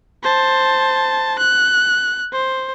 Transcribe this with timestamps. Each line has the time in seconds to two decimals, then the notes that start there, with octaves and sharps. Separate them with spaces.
0.23 C5 A5
1.39 F#6
2.33 C5